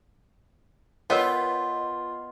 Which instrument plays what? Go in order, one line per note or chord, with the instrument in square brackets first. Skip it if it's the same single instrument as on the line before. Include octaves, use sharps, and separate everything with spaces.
[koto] B3 [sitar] F4 [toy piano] A#4 C#5 G5 [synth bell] B4 D#5